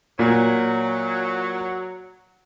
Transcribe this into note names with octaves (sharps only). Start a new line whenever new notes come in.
A#2 F#3